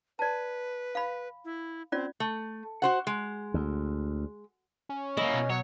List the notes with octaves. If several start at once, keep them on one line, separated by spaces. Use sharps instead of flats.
B4 D5 A5
F5 B5
E4
C4 C#4 F4 D5
A3
F#4 C5 F#5
G#3
D2
C#4
A#3 E4 D#5
B2
F#3 C#5